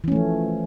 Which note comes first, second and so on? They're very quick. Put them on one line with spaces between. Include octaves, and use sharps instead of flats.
E3 C#4 A3 F3